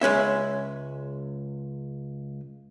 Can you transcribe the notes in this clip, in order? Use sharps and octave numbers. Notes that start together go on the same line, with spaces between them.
C#2 G#3 C#4 E5